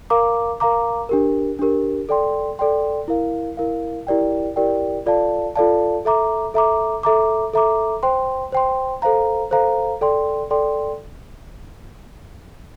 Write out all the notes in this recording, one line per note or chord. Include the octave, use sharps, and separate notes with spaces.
A#4 F5 A#5 D6
A#4 F5 A#5 D6
D4 G4 A#4
D4 G4 A#4
A4 D5 G5 C6
A4 D5 G5 C6
E4 A#4 F5
E4 A#4 F5
E4 G4 A#4 D5 G5
E4 G4 A#4 D5 G5
F4 A4 D5 F5 A5
F4 A4 D5 F5 A5
A4 E5 A#5 D6
A4 E5 A#5 D6
A4 E5 A#5 D6
A4 E5 A#5 D6
C5 G5 C6
C5 G5 C6
A4 C5 F5 A#5
A4 C5 F5 A#5
A4 D5 G5 C6
A4 D5 G5 C6